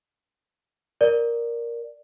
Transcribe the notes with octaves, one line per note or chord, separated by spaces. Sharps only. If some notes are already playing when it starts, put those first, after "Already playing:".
A#4 D5